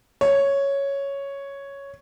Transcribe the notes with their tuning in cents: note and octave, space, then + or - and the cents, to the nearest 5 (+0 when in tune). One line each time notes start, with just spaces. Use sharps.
C#5 +0